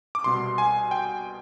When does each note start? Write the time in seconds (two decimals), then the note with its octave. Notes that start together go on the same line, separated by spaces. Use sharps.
0.15 D6
0.24 C2 B2 B3 C6
0.58 G#5
0.91 G5